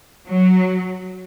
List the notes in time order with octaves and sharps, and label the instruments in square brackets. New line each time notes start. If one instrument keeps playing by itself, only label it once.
[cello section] F#3